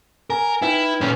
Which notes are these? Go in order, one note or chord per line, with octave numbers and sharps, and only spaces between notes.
A#4 G#5
D#4 E4 B4 G5
A#2 C#4 B4